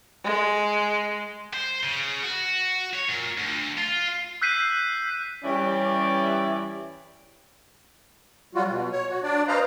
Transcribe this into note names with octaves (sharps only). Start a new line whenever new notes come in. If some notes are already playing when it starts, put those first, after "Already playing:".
G#3
C5
C#3
F#4
C#5
A#2
D2
F4
E6 F#6 G6 B6 C7 D#7
E3 G3 C#4 E4 G4 D5
F#3 G3 F4 F#4
B2
C#5
F#4
D4 D5
B4 C5 D#5 F5 A#5